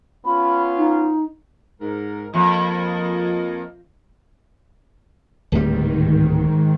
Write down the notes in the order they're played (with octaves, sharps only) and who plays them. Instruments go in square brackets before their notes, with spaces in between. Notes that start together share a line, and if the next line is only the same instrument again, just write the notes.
[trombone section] B3 C#4 F4 [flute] B5
[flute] D#4
[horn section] G#2 A#4
[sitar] F2 [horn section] A#3 A#4 D#5
[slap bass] D1 G3 [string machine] G#2 D#3